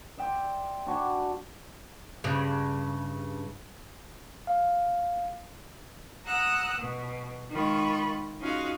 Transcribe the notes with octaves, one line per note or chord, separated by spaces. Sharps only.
D5 E5 G5 C6
D4 F#4 G#5 B5
G2 C#3
F5
F#5 A#5 D#6 E6 F#6
B2
D#3 G#3 F4 B5 C#6
C#4 D#4 F4 F#4 G#4 F5